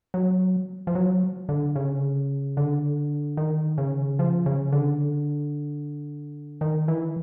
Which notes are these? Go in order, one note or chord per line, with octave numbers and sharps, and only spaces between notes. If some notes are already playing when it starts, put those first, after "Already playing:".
F#3
F3
F#3
D3
C#3
D3
D#3
C#3
F3
C#3
D3
D#3
E3